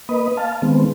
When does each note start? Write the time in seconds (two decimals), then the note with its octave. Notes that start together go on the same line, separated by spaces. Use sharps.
0.09 A#3 B4 D#5
0.37 F5 A5
0.62 D#3 G#3 B3 C4